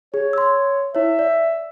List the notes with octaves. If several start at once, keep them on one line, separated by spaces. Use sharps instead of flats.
G#4 C#5
C6 E6
E4 C#5 E5
D5